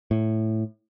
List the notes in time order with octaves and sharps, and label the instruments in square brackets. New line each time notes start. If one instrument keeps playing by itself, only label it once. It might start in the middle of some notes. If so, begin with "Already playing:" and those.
[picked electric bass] A2